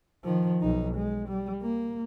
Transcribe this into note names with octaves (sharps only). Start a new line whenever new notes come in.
D#3 F3
B1 D#4
G#3
G3
A#3